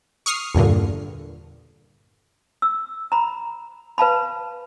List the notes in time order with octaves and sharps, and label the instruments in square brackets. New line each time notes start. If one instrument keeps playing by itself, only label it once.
[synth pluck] C#6 D#6 F6 C7
E2 G2 A#2 D3
[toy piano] E6
A#5 B5
B4 F5 A5 B5